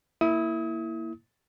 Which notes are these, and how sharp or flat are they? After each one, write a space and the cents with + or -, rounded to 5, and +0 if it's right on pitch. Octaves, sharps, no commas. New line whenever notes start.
A#3 -10 E4 +0 D#6 +35